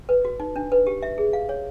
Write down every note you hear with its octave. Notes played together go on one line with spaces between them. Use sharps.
B4
F#4
D#4
D4
B4
G4
E5
G#4
F5
C#5